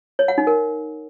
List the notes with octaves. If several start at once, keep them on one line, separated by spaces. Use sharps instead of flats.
C#5
F#5
D#4
A#4